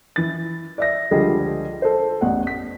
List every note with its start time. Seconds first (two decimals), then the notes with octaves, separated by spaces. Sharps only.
0.16 E3 A6
0.78 D5 E5 A#6
1.11 C#2 D3 F3 G3 G#4 D#5
1.82 A4 C5
2.21 A1 E2 F#5
2.47 B6